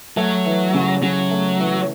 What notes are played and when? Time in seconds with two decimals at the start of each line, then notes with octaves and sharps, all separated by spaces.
0.17 F#3 A3
0.46 E3
0.74 C#3
1.02 C#3 F#3
1.31 A3
1.60 E3